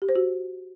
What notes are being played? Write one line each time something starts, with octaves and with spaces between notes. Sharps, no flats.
G4
C5
F#4